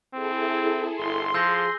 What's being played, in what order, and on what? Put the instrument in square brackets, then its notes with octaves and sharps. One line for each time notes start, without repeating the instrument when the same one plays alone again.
[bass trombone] C4 [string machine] E4 G#4 A4
[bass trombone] G1 [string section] C6
[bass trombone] F3 [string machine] G#4 [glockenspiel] E6 G6 A#6